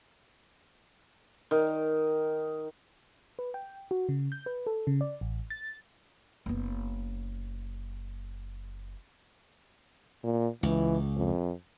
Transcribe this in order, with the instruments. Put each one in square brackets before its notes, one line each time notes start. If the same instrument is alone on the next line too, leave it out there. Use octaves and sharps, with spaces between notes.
[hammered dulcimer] D#3
[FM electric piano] B4
G5
F#4
C#3
G6
B4
A4
C#3
D5
A1
A6
[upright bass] F#1 B3
[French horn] A#2
[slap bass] C#2 [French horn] E3
[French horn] F2